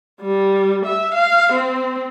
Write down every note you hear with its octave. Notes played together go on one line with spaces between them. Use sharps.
G3
E5
F5
C4